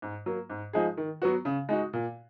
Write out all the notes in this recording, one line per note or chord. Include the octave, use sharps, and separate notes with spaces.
G#2
F#3 A#3
G#2
F3 G#3 D#4 G#4
D#3
F#3 B3 F#4
C#3
G#3 D#4 F#4
A#2